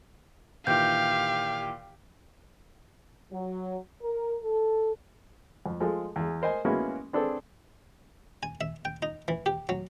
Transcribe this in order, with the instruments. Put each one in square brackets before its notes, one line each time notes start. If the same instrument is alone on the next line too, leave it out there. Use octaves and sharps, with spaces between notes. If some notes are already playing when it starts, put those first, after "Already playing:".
[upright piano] A#2 D#3 E3 [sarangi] G4 [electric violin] F5 [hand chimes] G6
[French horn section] F#3
A#4
A4
[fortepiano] F2
F3 G#3 G#4 A4
E2 G#4
A#4 C5 D#5 G#5
G#3 A#3 B3 C#4 E4 F#4
C4 D4 G#4 A4 B4 C5
[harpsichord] G#5
E5
G5
D#4
E3
G4
F#3